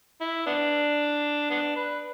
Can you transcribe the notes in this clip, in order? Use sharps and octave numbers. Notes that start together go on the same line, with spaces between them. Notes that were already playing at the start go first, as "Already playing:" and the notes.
E4
B3 D4
B3 D4
B4